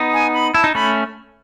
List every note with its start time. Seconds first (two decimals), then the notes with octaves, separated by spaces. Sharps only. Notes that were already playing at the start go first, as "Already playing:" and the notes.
Already playing: B3 D#4
0.13 G#5
0.34 B5
0.54 E4 A5
0.64 D#4
0.74 A3 C#4 B5